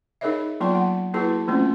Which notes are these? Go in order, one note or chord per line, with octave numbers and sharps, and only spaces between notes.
D#4 G#4 A#4 C#5 D#5 E5
F#3 A#3 B3 F4 A5 C6
F#5
A#3 E4 F#4 G#4 B4 A5
E3 A3 A#3 C4 C#4 F4